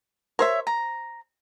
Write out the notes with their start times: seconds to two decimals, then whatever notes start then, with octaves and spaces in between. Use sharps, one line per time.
0.39 A#4 C5 C#5 E5
0.67 A#5